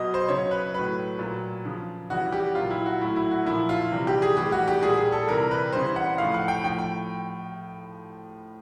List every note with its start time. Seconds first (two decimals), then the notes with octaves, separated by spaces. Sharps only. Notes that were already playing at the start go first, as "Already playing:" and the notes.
Already playing: B2 F#3 D#5
0.14 C5
0.29 C#3 F#3 C#5
0.51 B4
0.74 A2 F#3 B4
1.19 A#2 F#3
1.65 C#3 F3
2.10 C#3 E3 G3 F#4
2.32 G4
2.55 A#2 F#3 F4
2.70 E4
2.86 F#4
3.01 A2 F#3 E4
3.16 E4
3.31 F#4
3.46 A#2 F3 E4
3.69 F4
3.92 C3 E3 G3
4.07 G4
4.22 G#4
4.37 A2 E3 G3 G4
4.52 F#4
4.67 G4
4.82 A#2 G3 G#4
4.97 G#4
5.12 A4
5.27 C3 E3 G3 A#4
5.51 B4
5.73 C#3 E3 G3 C5
5.96 F#5
6.18 A2 F3 F5
6.34 F#5
6.48 G5
6.64 A2 F3 G5
6.78 G5